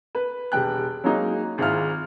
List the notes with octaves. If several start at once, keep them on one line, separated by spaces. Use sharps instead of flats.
B4
E1 G3 G5 F#6
F#3 G#3 A#3 D#4
G#1 G#2 E4 F4 F6